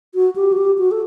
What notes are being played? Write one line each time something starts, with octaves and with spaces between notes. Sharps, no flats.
F#4
G4
F#4
G4
F#4
A4